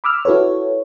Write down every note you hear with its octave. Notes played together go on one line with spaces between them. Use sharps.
B5 D6 E6 F6
E4 F#4 A4 B4 C#5